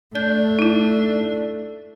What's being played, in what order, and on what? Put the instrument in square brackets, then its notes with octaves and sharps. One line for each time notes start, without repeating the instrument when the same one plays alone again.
[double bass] A3 [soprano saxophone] D4 [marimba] G6
[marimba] D#4 E4